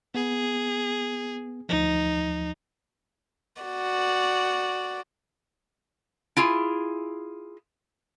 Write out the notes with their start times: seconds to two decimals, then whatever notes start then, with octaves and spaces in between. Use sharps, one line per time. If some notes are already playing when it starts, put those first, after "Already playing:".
0.15 B3 G#4
1.69 D2 F3 D#4
3.62 F#4 D5
6.37 E4 F4 G#4